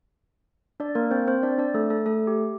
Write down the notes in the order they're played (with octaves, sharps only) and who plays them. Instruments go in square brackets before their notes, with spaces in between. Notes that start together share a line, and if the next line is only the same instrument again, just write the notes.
[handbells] D4 D5
A#3 A#4
C4 C5
C4 C5
D4 D5
D4 D5
A3 A4
A3 A4
A3 A4
G4